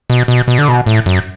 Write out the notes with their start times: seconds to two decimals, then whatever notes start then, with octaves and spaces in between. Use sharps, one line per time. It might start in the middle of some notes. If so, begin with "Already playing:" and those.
0.10 B2
0.28 B2
0.48 B2
0.58 D3
0.68 B2
0.86 A2
1.06 F#2